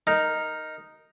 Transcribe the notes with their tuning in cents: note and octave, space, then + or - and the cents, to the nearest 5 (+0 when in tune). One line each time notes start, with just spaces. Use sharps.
D#4 +0 A#4 +0